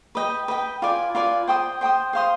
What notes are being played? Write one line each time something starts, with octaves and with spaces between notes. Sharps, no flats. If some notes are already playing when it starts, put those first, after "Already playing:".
B4 D#5 G5
B4 D#5 G5
F4 B4 D5 G#5
F4 B4 D5 G#5
C5 G5 C6 D#6
C5 G5 C6 D#6
C5 F5 C6 D#6